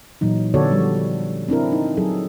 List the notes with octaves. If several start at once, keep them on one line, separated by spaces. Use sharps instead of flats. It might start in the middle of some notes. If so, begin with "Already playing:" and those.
A#2 E3 F#3 D#4
D3 B3 F#4 A4 C#5 D5
F3 G3
C4 D4 E4 A#4
D#4
F#3 G#4 A4